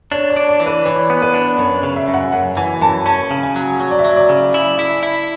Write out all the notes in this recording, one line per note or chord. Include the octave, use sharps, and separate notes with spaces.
D4 C#5
D5
D4
D5
E3
B4
E3 C#5
B3
B4
D4
F#2 C#5
C#3
E5
F#2
F#5
F#2 F#5
E3 G#5
F#2 A5
C#4 A5
C#3
G#5
F#3
F#3
D5
E5
F#3
D5
C#3
E4
E4
E4